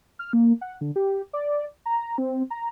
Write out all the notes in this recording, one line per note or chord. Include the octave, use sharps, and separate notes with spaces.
F6
A#3
F#5
D3
G4
D5
A#5
C4
A#5